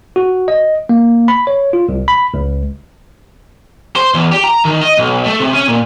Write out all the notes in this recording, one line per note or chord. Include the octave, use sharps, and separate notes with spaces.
F#4
D#5
A#3
B5
C#5
F4
C2
B5
C#2
C5
E2
G4
A#5
D#3
D#5
B1
A3
C3
C#4
A#2